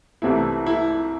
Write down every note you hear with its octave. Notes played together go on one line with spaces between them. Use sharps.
C2 C3 E3 A3 E4
E4